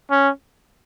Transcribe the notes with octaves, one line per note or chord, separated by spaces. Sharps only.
C#4